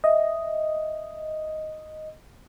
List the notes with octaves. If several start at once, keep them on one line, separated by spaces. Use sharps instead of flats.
D#5 E5